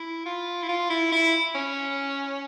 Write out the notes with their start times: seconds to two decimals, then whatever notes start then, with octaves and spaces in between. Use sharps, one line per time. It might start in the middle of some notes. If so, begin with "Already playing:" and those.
Already playing: E4
0.26 F4
0.62 E4
0.69 F4
0.90 E4
1.12 E4
1.55 C#4